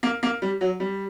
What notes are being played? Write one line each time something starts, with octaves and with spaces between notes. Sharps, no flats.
A#3
A#3
G3
F#3
G3